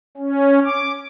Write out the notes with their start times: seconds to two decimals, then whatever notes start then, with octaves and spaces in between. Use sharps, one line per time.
0.17 C#4
0.65 D6